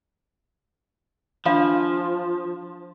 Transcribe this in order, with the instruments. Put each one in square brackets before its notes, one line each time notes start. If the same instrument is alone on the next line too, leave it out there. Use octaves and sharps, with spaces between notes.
[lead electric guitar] F3 [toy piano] D4 F5 B5